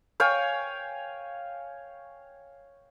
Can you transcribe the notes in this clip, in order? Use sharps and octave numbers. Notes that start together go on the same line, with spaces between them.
C#5 F5 G5 G#5